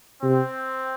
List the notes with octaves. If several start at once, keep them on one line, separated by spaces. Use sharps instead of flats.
C3 C4